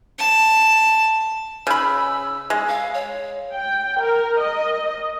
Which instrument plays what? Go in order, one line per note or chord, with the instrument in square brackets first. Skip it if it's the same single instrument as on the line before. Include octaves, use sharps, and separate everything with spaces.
[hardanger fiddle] A5
[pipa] C#3 B5 [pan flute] E6
[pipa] G#3
[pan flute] F5
C#5
[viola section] G5
A#4
D#5